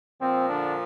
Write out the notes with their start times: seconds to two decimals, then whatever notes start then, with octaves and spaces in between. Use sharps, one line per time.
0.20 A#2 F3 C4
0.49 D3 D4